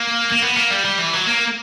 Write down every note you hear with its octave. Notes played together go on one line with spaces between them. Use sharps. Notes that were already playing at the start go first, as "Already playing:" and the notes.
Already playing: A#3
A#3
B3
A#3
G3
G3
E3
F#3
A#3